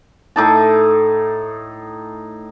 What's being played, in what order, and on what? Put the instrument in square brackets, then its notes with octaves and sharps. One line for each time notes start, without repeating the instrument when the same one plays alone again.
[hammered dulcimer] A2 D#4 A5